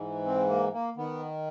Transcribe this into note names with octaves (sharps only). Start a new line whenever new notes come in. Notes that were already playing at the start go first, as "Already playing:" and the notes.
Already playing: G#2 E3
C4
A#3
A#3
D#3 B3